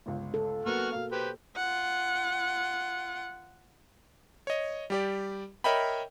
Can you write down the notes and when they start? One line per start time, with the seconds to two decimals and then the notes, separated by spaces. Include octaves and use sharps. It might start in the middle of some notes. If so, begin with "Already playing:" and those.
0.06 G1 C#2
0.34 A4
0.66 F#3 A#3 B3 F#5 C#6 F6
0.92 B2 A#3 F5
1.12 G4 B4 C5
1.56 F4 F#5
4.47 C#5 D#5
4.90 G3 G4 D5
5.64 A#4 C#5 D#5 E5 G5 B5